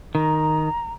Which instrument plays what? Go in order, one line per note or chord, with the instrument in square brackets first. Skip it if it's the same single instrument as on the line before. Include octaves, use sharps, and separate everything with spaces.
[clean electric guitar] D#3 [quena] A#5